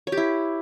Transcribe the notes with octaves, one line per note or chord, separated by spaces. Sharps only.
C#5
G4
E4